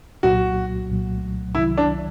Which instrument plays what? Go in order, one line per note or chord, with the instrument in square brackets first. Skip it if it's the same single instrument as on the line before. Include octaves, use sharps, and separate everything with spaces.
[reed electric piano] C2 A#2 F#3 [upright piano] F#4
[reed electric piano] C2 A#2 F#3
[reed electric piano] C2 C3 D#3 F#3 [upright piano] E4
[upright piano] D4